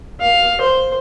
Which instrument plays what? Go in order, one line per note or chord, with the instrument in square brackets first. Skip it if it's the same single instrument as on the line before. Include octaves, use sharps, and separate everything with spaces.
[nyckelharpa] F5
C5